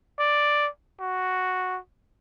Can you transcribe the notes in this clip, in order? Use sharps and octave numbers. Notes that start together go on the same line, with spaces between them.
D5
F#4